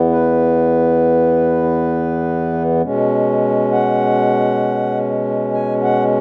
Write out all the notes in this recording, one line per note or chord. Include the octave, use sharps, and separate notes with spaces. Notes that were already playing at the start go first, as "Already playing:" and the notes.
Already playing: E2 E3 B3
B4
B2 G#3 C#4
F#5
G#5
F#5